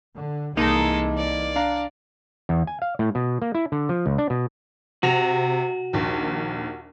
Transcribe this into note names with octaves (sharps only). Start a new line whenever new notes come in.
D3
C2 E3 G#3 A#3 D#4 A4
D5
D4 F5 A#5
E2
G#5
F5
A2
B2
A#3
E4
D3
F3
C#2
D4
B2
C3 F#4 A#6 F7
A#1 D#2